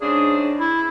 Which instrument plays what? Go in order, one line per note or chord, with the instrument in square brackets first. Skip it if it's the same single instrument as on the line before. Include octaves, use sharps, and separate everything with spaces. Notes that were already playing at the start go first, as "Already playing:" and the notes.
[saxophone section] G#2 C#3 D4 [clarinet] G#4
[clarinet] E4